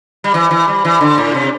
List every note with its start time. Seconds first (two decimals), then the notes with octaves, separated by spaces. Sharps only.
0.24 G3
0.34 E3
0.51 E3
0.68 G3
0.85 E3
1.01 D3
1.18 A2
1.34 C3